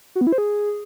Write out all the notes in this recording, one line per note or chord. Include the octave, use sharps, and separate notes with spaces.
F#4
B3
E4
C5
G#4